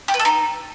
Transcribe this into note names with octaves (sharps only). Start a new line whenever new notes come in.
G4
B4
A4
D#4